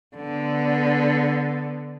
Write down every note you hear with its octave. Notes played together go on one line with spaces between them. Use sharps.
D3 B3